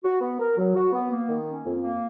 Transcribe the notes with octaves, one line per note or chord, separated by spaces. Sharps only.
F#4
B3
A#4
F#3
F#4
B3
A#3
D#3
C#4
F2
A#3